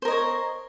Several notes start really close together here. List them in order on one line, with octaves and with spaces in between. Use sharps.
C5 A#4 D#5 C#5